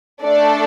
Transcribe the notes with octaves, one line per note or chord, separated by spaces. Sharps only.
A3 D4 A4 D5